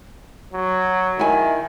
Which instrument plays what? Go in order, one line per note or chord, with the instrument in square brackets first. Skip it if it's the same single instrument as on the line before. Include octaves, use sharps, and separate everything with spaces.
[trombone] F#3
[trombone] D#3 [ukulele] E4 G#5